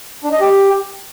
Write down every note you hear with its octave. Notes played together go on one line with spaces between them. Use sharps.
D4
D#5
G4